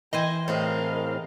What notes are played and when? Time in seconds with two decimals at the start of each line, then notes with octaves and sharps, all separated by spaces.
0.13 E3 C5 D#5 G5 G#5
0.48 A2 C4 G#4 A#4 F5